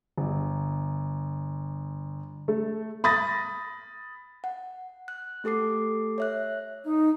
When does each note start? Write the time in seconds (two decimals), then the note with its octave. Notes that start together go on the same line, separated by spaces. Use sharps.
0.18 G1
2.48 A3
3.04 B5 D#6 A6 A#6
4.44 F#5
5.08 F#6
5.44 A3 G4 A4 D6 C7
6.18 C#5 E5 F#6
6.83 D#4